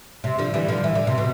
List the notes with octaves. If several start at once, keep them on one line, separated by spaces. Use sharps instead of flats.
C3
D3 F3
E3 G3
D3 F3
E3
D3
C3
B2